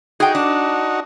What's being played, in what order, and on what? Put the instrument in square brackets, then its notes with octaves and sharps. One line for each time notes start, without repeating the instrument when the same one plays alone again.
[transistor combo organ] D#4 F#4 [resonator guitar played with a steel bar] G#4 G5
[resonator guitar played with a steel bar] D4